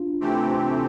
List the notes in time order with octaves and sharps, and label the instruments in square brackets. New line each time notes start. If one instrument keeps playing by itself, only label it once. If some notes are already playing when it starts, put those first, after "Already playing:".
Already playing: [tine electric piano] D4 F4
[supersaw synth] C3 E3 A3 C4 G4